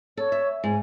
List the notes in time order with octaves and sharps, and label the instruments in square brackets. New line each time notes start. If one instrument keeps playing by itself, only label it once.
[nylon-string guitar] A4 [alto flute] C#5
[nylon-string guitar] E5
[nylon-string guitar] G#2 [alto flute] G#5